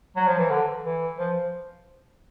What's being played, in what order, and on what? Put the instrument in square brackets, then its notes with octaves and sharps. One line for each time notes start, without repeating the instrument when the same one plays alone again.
[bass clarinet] F#3
F3
E3
D3
E3
F3